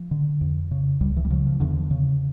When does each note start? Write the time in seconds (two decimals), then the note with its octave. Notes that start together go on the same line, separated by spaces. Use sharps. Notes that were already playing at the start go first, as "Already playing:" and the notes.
Already playing: F3
0.11 D3
0.41 F2
0.71 C#3
1.01 C#2 G3
1.17 E3
1.25 G3
1.30 C#3 F3
1.46 F3
1.60 E2 D3
1.91 C#3